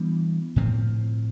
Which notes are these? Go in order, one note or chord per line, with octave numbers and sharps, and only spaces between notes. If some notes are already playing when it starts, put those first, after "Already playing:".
Already playing: E3 G3 B3 D4
A2 F3 C4